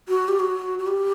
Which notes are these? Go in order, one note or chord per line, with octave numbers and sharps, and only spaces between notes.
F#4
G4
F#4
F#4
G4